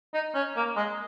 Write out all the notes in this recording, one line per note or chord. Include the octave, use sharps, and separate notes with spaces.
D#4
C#4
A#3
G#3